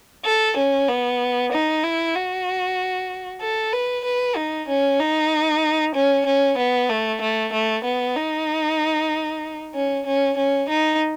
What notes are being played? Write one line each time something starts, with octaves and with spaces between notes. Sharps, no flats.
A4
C#4
B3
D#4
E4
F#4
A4
B4
B4
D#4
C#4
D#4
C#4
C#4
B3
A3
A3
A3
B3
D#4
C#4
C#4
C#4
D#4